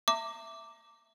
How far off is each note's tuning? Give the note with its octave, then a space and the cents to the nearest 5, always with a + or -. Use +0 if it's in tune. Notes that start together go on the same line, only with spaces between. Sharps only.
E5 +0 A#5 -35 D6 -5